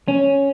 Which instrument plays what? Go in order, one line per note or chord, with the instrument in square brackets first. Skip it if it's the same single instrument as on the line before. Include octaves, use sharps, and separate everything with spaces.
[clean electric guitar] C#4